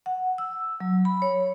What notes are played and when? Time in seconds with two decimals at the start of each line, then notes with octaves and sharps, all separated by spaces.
0.06 F#5
0.38 E6
0.80 F#3
1.05 B5
1.22 C#5